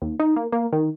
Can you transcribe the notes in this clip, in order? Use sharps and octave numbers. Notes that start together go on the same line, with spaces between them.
D#2
D#4
A#3
A#3
D#3